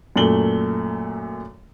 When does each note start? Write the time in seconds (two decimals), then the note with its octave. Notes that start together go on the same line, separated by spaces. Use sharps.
0.16 F#2 A#2 A3 F#7 G7